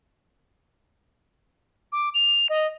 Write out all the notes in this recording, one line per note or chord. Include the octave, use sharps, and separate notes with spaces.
D6
F7
D#5